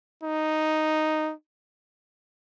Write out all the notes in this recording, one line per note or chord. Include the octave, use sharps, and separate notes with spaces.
D#4